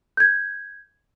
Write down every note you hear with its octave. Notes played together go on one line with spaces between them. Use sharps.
G6 G#6